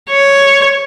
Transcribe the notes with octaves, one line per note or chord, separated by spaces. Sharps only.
C#5